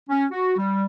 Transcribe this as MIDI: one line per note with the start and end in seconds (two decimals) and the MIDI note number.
0.10 0.25 61
0.31 0.55 66
0.57 0.85 55